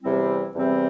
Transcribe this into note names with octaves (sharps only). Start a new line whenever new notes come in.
E2 C3 G3 C4 E4
E2 C3 G3 C4 E4